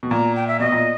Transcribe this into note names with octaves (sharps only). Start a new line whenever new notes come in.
B2
A#2 A#5
G5
E5
B2 D#5
A#2